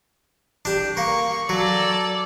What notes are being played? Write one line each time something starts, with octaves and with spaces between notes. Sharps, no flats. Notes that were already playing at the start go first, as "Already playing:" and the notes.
D4 G4
A#3 C#6
F#3 A4 D5